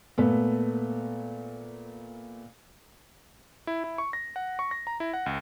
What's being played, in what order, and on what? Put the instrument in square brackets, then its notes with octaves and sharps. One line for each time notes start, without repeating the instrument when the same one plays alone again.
[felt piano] A#2 A3 B3
[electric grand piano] E4
E4
C#6
A#6
F#5
C#6
A#6
A#5
E4
F#5
C#2